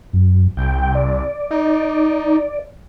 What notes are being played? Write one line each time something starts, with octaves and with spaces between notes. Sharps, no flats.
F#2
C2 G5
D5
D#4